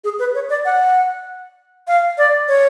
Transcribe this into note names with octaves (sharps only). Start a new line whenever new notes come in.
G#4
B4
C#5
D5
F#5
F5
D5
C#5